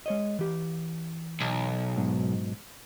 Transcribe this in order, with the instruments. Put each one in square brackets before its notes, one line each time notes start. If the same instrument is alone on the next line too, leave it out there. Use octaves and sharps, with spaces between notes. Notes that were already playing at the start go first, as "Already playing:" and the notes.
[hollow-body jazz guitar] G#3 C#5 D#5
E3 G4
[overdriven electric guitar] B1
[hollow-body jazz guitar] G#2 B2 F#3